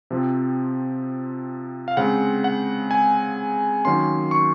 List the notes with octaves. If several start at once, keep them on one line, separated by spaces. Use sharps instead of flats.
C3 F3 C4
F5
C#3 G#3 C4 F#5
F#5
G#5
D#3 F#3 A#3 C#4 C6
C#6